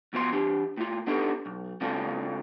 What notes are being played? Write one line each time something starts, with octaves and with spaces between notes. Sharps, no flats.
F2 B2 F3 C#5 C6
E3 D4 G4
A2 F4
B3 D4 D#4 G4 A4
B1
C#3 G#3 C4 D4 F4 A4